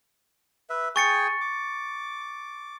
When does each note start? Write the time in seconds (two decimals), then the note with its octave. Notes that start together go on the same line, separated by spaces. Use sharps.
0.70 B4 E5
0.96 G#4 G5 G#5 C#6 A6 C#7
1.41 D6